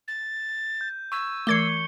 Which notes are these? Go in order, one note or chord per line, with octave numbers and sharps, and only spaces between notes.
A6
G6
C#6 E6 G#6
E3 A3 A#4 D6 G#6 C7 C#7 G7